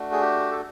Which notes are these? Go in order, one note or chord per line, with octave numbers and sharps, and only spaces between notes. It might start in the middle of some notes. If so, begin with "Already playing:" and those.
Already playing: A3 D4 F#4
G#4
G4
A4